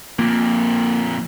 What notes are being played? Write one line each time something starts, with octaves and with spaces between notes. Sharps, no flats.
F2 A#2 A#3